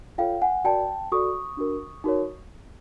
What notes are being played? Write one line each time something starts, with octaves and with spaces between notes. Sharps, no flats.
F4 A4 C#5 F5 G5
F#5 G#5
F#4 A#4 D5 G5 A5
F#4 A4 D5 C#6 D#6
D4 F#4 A#4
D#4 F#4 A#4 C#5